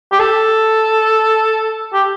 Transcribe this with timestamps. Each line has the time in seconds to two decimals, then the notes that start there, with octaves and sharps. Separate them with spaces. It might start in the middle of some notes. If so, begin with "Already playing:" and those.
0.12 G4
0.20 A4
1.93 G4